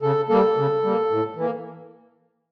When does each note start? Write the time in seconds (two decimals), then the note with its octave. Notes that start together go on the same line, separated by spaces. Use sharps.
0.02 C#3 A4
0.29 G3 A#3 A4
0.56 C#3
0.84 G3 A#3
1.10 A2
1.36 E3 A#3